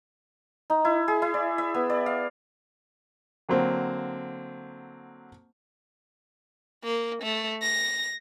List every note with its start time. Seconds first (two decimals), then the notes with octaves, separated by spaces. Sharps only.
0.70 D#4
0.85 E4
1.08 G#4
1.22 E4
1.34 D5
1.58 E5
1.74 B3
1.90 D5
2.06 F5
3.49 D3 F#3 A#3 C4
6.84 A#3
7.22 A3
7.62 A#6